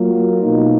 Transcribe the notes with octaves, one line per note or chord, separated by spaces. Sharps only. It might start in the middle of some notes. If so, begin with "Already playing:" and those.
Already playing: F#3 A#3 F4
B2 A#3 D#4